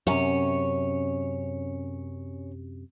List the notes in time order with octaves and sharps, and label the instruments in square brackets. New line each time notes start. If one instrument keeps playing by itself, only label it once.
[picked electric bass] F#2 C3 [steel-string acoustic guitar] C#4 C#5